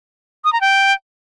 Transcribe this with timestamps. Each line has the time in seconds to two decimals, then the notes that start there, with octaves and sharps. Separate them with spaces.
0.44 D#6
0.53 A#5
0.61 G5